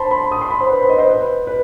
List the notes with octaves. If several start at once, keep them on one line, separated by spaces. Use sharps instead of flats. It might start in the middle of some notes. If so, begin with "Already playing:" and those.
Already playing: C5 A5 B5 C6
B5
D#6
C6
B5
C5
B4
C5
D#5
C5
B4
B4